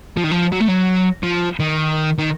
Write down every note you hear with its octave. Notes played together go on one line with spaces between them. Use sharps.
F3
D#3
F3
F#3
A3
F#3
F3
D#3
D#3